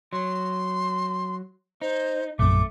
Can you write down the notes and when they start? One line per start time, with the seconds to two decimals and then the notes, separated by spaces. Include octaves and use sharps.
0.13 F#3 C6
1.82 D#4 C5
2.39 A#1 F#2 A3 D6